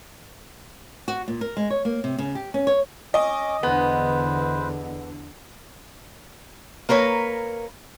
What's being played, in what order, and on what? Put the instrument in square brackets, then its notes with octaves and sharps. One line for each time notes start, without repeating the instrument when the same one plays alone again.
[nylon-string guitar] F#4
A#2
A#4
G#3
C#5
A#3
C3
C#3
G4
C#4
C#5
[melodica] C#4 D6 [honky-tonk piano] D#5
[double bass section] E2 D3 [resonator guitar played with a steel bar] B3 [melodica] B4 C5
[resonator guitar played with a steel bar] A#3 A#4 B4 C#5